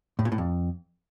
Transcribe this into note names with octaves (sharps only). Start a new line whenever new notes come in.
A2
A#2
A2
F2